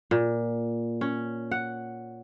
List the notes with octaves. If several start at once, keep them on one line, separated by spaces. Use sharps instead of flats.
A#2
C#4
F#5